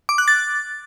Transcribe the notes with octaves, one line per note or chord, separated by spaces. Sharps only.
D6
F#6
A6